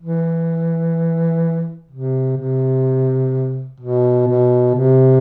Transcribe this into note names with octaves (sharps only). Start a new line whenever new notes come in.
E3
C3
C3
B2
B2
C3